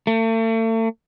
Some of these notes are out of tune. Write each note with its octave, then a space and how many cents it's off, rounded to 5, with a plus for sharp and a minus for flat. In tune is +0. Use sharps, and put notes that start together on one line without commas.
A3 +40